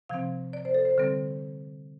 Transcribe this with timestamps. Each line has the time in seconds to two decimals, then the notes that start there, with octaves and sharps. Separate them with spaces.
0.09 C3 F3 C4 F5
0.53 D5
0.65 C5
0.74 A4
0.85 C5
0.98 D3 G3 C4 A4